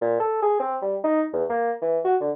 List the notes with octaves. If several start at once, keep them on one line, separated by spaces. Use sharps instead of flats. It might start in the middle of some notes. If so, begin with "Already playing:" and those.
A#2
A4
G#4
C4
G3
D#4
E2
A#3
E3
F#4
D3